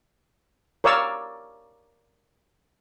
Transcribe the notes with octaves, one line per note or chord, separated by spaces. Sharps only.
A#4 C#5 D5 F5 E6